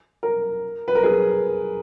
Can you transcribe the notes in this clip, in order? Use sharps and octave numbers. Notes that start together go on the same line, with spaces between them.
A#4
B4
A#4
G#4